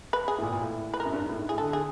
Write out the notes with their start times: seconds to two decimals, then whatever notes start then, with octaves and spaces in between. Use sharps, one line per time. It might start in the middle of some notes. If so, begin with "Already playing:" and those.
0.13 B4
0.28 G#4
0.38 A2
0.42 A#2
0.52 A#2
0.62 A2
0.94 B4
1.00 A#4
1.05 F#2
1.13 G2
1.22 G#2
1.29 A2
1.39 G#2
1.49 A2 G#4
1.58 D3 A4
1.69 D3
1.73 G#4